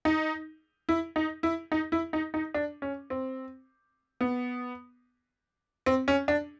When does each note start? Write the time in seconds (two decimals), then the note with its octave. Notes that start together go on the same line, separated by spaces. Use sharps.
0.05 D#4
0.89 E4
1.16 D#4
1.43 E4
1.72 D#4
1.92 E4
2.13 D#4
2.34 D#4
2.54 D4
2.82 C#4
3.10 C4
4.21 B3
5.86 C4
6.08 C#4
6.28 D4